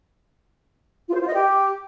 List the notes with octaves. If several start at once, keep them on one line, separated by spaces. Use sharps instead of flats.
F4
C5
F4
D#5
G4